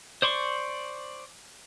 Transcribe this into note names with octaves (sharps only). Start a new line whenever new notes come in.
C5 D5 C6 C#6